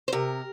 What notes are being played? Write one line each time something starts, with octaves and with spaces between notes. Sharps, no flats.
C5
C3 A#4